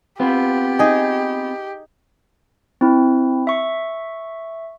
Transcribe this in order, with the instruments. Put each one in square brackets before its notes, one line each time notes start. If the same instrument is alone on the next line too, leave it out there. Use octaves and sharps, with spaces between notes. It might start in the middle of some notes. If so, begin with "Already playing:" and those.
[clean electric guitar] B3 C4 F4 [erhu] G4
[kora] D#4 G#4
[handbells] C4 E4
E5 C#6